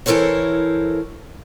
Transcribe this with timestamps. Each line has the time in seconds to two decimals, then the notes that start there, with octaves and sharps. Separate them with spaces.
0.06 E3 E4 A4 A#4 C5 C#5